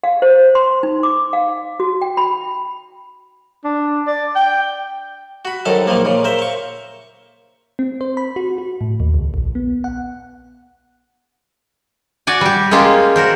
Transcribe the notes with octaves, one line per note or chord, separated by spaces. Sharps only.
F5
C5
C6
D#4
D6
F5
F#4
G5
B5
D4
D5
G5
F#4 B5
C2 F#2 D#3 A4 A5
A#1 D#3 F3 A#3
A#2 C#3
A#4 C5 E5
F5 C#6
C4
C5
B5
F#4
F#4
A2
D#2
C#2
A#1
B3
F#5
F#4 D5 G#5
G3 G4
G#3 A#3 C#4 F4 G4
F#4 A#4 C5